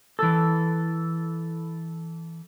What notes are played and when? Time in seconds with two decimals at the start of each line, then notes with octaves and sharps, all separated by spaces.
0.19 E3 A4